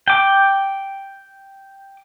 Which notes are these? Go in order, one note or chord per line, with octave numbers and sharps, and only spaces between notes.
G5 D6